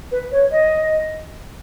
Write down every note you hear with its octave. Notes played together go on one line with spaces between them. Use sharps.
B4
C#5
D#5